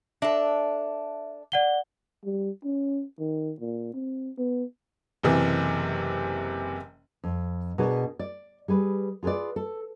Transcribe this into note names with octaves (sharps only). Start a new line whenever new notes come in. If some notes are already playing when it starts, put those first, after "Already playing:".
D4 A4 E5
D5 F#5 G7
G3
C#4
D#3
A#2
C4
B3
F#1 C3 E3
F2
B2 D4 G#4 A#4
D5
G3 G#4 B4
F4 G#4 A#4 B4 D5
A4